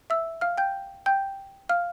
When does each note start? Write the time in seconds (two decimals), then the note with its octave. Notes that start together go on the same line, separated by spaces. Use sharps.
0.10 E5 E6
0.41 F5 F6
0.58 G5 G6
1.06 G5 G6
1.69 F5 F6